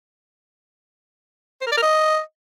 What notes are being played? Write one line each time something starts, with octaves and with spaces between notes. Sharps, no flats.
C5
A#4
D5
A#4
D#5